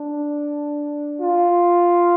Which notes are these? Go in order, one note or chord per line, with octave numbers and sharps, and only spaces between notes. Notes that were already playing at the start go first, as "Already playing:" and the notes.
Already playing: D4
F4